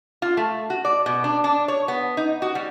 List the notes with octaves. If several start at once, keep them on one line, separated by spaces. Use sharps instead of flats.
F4
A3
F#4
D5
B2
D4
D4
C#5
B3
D#4
F#4
G3